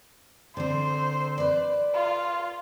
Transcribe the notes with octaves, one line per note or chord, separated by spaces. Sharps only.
D3 C4 C5
B4 D5
F4